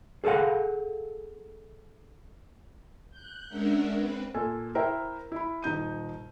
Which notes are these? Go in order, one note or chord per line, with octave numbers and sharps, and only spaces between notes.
G#4 A4 B4 F5 F#5
F#6 G6
G#3 C#4 D4 A#4 E5 F#5
C4 B4
A#2 A4 G#5
E4 A#4 C5 E5 G5
E4 B5
D#1 D#4 G6 D#7